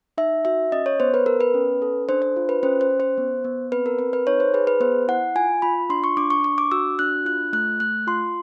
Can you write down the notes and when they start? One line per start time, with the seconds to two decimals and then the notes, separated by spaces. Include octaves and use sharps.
0.18 D#4 E5
0.45 F#4 E5
0.72 C#4 D#5
0.86 C#5
1.00 B3 C5
1.14 B4
1.26 B3 A#4
1.41 B4
1.54 C#4
1.82 A4
2.09 D4 C5
2.22 C5
2.36 F4
2.49 B4
2.63 C#4 C5
2.81 C5
2.90 C#4
3.00 C5
3.18 B3
3.44 B3
3.72 C4 B4
3.86 A#4
3.99 C4 B4
4.13 B4
4.27 D#4 C#5
4.40 C5
4.54 G#4 B4
4.67 B4
4.80 B3 C5
5.08 E4 F#5
5.36 F4 G#5
5.62 F4 B5
5.89 D4 C6
6.04 C#6
6.17 D4 D6
6.30 C#6
6.44 D4 C#6
6.58 D6
6.72 F#4 E6
6.99 D4 F#6
7.25 F4 F#6
7.53 A3 F#6
7.80 A3 F#6
8.07 F4 C6